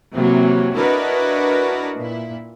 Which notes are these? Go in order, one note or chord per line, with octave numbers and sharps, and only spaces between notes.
C3 E3 F#3 A#3
D4 E4 F#4 A#4 B4 D#5
A#2 E4